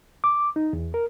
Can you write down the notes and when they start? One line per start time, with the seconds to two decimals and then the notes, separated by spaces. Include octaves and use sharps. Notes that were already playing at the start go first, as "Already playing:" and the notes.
0.24 D6
0.56 D#4
0.73 E2
0.94 A#4